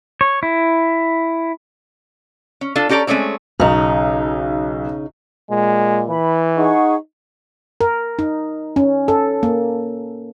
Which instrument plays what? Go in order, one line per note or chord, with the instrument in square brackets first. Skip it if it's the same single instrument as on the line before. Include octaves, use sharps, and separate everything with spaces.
[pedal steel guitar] C#5
E4
[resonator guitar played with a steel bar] C#4
D4 F4 A4
C#4 G4 A4 D5 A#5
G#3 A3 C4 C#4 D5
[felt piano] B1 [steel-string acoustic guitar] C#3 D#4
[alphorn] A#2 [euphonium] G#3
[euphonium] E3 [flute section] B5
[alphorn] D#4 [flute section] G#4 F#5 C#6
[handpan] A#4
D#4
C#4
A4
A#3